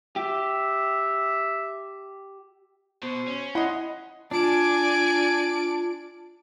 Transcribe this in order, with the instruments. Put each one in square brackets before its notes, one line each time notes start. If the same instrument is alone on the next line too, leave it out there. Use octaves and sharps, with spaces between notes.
[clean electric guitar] G4 [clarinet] E5
[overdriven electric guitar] B2 [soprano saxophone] C5
[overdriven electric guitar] C#4
[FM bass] E4 [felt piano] D#5 F#5 [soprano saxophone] C6
[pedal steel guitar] D4 [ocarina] F4 [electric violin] D5 D7 [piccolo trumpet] G#5